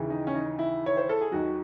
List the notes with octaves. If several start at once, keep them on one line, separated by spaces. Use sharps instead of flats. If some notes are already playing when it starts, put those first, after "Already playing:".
Already playing: D#2 C#3 E3
D#4
C#4
D#4
E4
C#5
C5
A4
G#4
D#2 D#3 F#3 F#4